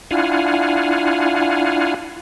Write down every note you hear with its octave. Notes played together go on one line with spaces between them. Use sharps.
D4 E4 F4 F5 F#5 G#5